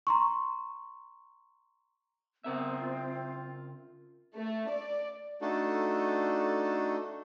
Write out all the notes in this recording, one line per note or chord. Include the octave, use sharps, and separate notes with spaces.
A#5 C6 C#6
C#3 B3 C4 A#4 E5
F4
A3
D5
A3 D4 D#4 F#4 A4